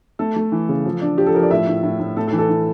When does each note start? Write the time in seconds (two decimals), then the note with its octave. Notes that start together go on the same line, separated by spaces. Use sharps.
0.19 A3 A4
0.36 A3
0.52 E3
0.69 C#3
0.85 F3
1.01 D4
1.18 F3 G4
1.27 A4
1.34 F3 A#4
1.43 D5
1.51 A2 E5
1.68 A2
1.83 A2
2.00 A2
2.17 A3 A4
2.27 A4
2.32 E3
2.38 A4
2.49 E3